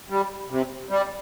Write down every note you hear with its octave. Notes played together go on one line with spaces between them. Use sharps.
G3
C3
G3